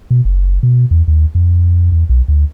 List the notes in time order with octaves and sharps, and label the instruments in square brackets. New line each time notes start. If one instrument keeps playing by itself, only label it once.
[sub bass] B2
F#1
B2
E2
D#2
F2
E2
B1
D2